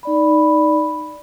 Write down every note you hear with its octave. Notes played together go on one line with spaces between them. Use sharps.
D#4 D5 B5